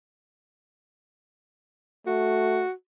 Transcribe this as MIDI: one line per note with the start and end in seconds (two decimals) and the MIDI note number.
2.07 2.63 57
2.07 2.72 66